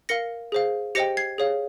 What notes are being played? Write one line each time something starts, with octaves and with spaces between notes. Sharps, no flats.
A#4 F5 A#6 C#7
G#4 C5 F5
G4 C5 D#5 G5 A#6 C#7
G#6 C7
G#4 C#5 F5